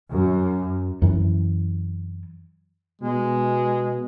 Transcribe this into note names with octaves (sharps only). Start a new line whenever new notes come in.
F#2
F#2 E3
B2 G#3